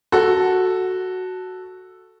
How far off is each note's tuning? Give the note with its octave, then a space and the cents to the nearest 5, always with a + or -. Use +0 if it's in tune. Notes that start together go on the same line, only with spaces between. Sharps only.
F#4 +0 A4 +0